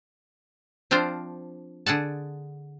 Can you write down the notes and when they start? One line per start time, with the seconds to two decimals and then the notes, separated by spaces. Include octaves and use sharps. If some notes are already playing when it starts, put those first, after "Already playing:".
0.91 F3 C4 D4 F4 C5
1.86 D3 G#4 F#5 A5